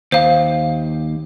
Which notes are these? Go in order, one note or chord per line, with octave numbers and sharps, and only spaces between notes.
D#2 C5 F5